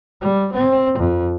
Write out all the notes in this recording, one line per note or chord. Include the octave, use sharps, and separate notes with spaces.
G3
C4
F2